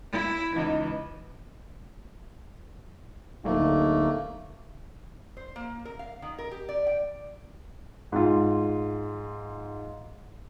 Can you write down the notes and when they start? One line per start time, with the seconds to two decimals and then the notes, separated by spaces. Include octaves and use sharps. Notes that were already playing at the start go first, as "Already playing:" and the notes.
0.12 E4
0.56 C#2 E3 D#4
3.45 D1 A3 A#3 D#4
5.37 C5
5.56 A#3
5.85 A#4
5.99 F5
6.22 D#3
6.39 A#4
6.51 G4
6.69 D5
6.87 G5
8.12 G#2 F4